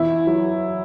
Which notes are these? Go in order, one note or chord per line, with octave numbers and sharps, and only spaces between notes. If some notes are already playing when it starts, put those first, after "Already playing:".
Already playing: E2 E4
F#3